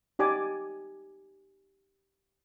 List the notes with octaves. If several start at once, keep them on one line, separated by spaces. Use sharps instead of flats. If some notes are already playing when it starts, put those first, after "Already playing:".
D#4 G4 D5 G#5 D6